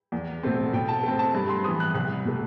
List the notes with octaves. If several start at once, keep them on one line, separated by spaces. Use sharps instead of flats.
E2
B2 A3 C4
B2 G5
A5
A3 C4
A5
G2 A5
C6
E3 B3 D#6
F#6
C2 F#6
B2 A3